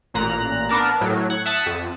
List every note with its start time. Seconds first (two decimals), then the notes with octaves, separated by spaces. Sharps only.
0.14 A1 A#2 A#5 F#6
0.69 B3 D4 A#4 A5
1.01 A2 F#3
1.30 F#5 G#6
1.46 E5 F#5 A5 D#6 E6
1.66 F2